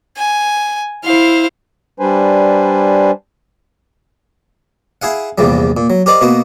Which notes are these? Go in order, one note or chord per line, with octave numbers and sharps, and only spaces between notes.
G#5
E4 C5 F5
G3 D4 B4 C5 G#5
E4 G#4 F5 F#5
A#1 E2 C3 F3 G3
A#2
F#3
G4 A#4 C5 D5 D#5
B2 A#3 B3 F#4